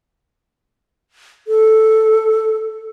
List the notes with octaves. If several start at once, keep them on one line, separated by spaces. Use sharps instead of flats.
A4